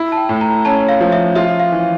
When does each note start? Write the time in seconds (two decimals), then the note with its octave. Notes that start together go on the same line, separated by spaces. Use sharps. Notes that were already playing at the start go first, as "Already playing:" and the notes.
Already playing: E4 E5
0.12 A5
0.17 G5
0.29 A2
0.41 A#5
0.65 C#4 A5
0.89 F5
1.01 F3
1.12 E5
1.35 F4 E5
1.60 F5
1.72 E3